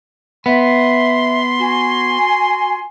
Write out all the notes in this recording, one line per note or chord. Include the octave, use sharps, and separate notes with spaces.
B3 E5 C6
F#4 G#5